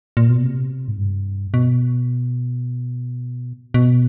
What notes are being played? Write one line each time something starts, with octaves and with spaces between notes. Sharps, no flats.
A#2
B2
C3
G#2
G2
B2
B2